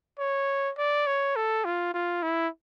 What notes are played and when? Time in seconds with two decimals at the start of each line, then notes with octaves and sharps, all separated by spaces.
0.19 C#5
0.78 D5
1.07 C#5
1.36 A4
1.65 F4
1.94 F4
2.23 E4